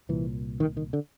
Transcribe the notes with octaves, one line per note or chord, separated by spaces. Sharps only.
C2 A#2 E3
D#3
D#3
D3